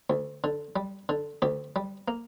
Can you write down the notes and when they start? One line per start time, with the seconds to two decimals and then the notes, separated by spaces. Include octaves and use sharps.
0.10 D2
0.44 D3
0.76 G3
1.09 D3
1.42 D2 G4
1.76 G3
2.08 A#3